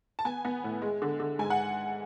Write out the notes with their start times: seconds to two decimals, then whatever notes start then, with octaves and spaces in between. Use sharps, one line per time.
0.19 A5
0.25 B3 G#5
0.45 B3
0.64 A2
0.82 G#3
1.02 D3
1.20 D3
1.39 G#2 G#5
1.50 F#5